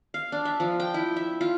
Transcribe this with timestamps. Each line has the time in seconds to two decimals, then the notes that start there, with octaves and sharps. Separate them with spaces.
0.14 F5
0.32 D4
0.45 E5
0.60 F3
0.80 G5
0.94 E4
1.16 E5
1.41 F4